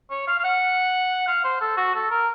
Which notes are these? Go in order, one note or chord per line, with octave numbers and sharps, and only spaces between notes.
C#5
F5
F5
F#5
F5
C5
A4
F#4
A4
A#4